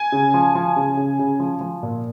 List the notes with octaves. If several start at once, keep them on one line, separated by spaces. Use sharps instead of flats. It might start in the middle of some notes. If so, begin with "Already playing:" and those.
Already playing: G#5
C#3
F3
F3
C#3
C#3
C#3
F3
F3
A#2